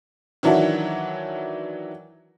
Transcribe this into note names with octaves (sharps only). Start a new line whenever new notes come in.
D#3 E3 F#3 D4 E4 F#4